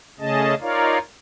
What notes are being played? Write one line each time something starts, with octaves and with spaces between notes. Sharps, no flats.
C#3 A3 C#4 G#4 D#5 A5
D#4 F4 A#4 C#5 D5 F5